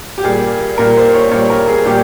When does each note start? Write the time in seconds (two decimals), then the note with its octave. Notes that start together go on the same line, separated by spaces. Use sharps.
0.18 G4
0.24 A#2 G3 A#3 G#4
0.78 A#2 G3 A#3 A#4
0.97 C5
1.14 C#5
1.31 A#2 G3 A#3 C#5
1.50 A#4
1.68 G#4
1.86 A#2 G3 A#3 G4